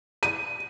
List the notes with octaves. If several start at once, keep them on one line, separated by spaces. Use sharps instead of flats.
D#7